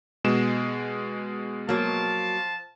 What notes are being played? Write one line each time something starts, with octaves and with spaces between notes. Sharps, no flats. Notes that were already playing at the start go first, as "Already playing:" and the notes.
B2 G#3 E7
F3 F#3 A#3 F5 A5